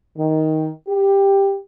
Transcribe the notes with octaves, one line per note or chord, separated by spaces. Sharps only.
D#3
G4